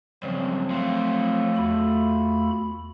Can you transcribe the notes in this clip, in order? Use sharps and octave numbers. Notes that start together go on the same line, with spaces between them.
G2 C#3 F3 F#3 C4
A3 F4
E2 F#4 B5